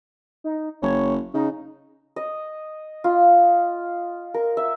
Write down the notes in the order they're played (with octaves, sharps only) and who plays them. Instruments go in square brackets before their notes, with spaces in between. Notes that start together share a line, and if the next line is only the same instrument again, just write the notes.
[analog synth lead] D#4
[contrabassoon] F#1 [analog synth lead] C#5
[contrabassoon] C#3 [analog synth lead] D#4
[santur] D#5
F4
A#4
E5